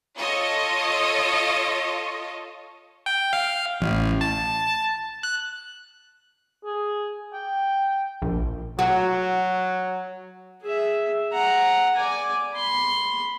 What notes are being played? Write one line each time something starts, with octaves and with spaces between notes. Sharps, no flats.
F4 A4 C#5 D#5
G5
F5
A1
A5
F#6
G#4
G5
A#1
F#3 F#4
G#4 E5
F#5 A#5
D5 G#5
B5 C6